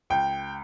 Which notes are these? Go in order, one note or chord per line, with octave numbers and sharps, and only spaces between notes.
C#2 G5